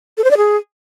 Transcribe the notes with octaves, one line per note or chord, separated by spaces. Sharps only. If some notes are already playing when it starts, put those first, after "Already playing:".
A4
C5
D5
G#4